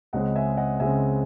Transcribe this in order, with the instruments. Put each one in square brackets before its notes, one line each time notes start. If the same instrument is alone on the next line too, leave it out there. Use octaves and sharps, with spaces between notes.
[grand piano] C#2 C#3 G#3 C4 D#5 F#5
E5 G#5
D#5 F#5
C#2 C#3 G#3 C4 E5 G#5